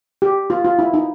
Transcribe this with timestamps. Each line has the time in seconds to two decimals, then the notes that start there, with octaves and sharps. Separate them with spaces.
0.22 G4
0.50 F4
0.64 F4
0.79 E4
0.94 D#4